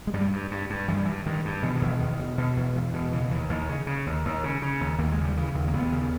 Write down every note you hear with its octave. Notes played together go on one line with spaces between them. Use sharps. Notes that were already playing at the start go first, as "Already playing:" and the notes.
G#3
G2 G3
G2
G2
G2
G2 E3
G3
E3
G2
G2 D#3
G2
B2 E3
D#3
E2
E2 D#3
B2
B2
E2
E2
B2
C#3 E3
D#2 E3
D#2 E3
C#3
C#3
D#2
D#2
C#3
C#3
D#2
D#2 A#3
G#3
C#3
G3
C#3 E3
D#2
A#3
D#2 B3
C#3